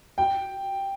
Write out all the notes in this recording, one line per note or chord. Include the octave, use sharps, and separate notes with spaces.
G5